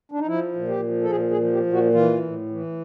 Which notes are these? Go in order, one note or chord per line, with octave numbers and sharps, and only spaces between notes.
D4
D#4
F3 E4
A#2
G4
F3
A4
A#2 G#4
G#4
F3
G4
A#2
F#4
E3 F4
A2
E3